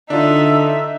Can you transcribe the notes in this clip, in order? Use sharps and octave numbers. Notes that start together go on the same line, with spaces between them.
D3 D4 D#4 F4 E5